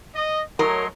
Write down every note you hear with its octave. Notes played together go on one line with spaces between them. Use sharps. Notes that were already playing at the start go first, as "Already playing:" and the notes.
D#5
F#3 A3 A#4 C#5 D#5 C6